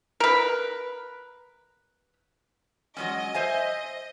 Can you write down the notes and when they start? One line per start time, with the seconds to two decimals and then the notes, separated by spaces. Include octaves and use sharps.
0.20 A#4 B4
2.97 F#3 G#3 C#4 D#5
3.34 C5 E5 G#5